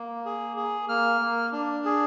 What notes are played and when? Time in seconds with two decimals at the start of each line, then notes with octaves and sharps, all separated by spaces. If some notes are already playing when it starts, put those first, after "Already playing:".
Already playing: A#3
0.26 G#4
0.57 G#4
0.89 A#3 F6
1.21 A#3
1.52 D4
1.85 G#4